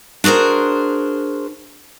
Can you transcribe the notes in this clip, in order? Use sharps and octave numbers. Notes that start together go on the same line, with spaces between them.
D4 F#4 G#4 A#4 C5